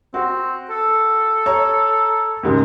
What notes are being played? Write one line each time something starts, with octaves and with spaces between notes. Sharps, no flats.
C4 F#4
A4
C#5 A#5
D#2 G#2 C#3